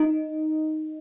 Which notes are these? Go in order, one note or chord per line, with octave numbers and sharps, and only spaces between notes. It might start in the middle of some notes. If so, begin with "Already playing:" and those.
Already playing: D#4